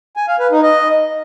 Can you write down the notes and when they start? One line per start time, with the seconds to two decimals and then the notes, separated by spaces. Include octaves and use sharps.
0.17 G#5
0.28 F5
0.40 B4
0.51 D#4
0.63 D#5